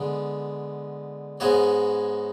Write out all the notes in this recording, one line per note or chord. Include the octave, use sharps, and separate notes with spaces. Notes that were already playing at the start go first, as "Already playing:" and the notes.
Already playing: D3 G#3 B3
G#2 G#3 B3 F#4 C#5